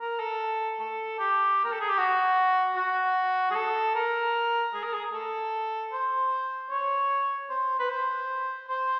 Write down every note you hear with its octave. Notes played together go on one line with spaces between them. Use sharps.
A#4
A4
A4
G4
A#4
A4
G#4
G4
F#4
F#4
G#4
A4
A#4
G#4
A#4
G#4
A4
C5
C#5
C5
B4
C5
C5